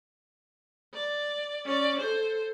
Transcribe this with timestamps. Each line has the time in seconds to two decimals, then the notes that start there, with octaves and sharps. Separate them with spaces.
0.94 D5
1.65 C#4 D5
1.99 A4 C5